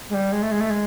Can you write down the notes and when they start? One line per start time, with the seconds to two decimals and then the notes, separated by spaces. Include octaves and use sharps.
0.09 G#3
0.14 G3
0.32 G#3
0.42 A3
0.51 G#3
0.60 A3
0.70 G#3